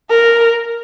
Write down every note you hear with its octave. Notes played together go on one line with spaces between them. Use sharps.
A#4